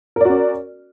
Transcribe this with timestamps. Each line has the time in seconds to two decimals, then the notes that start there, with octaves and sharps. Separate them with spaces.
0.16 A#4
0.21 D5
0.25 F#4
0.29 C#4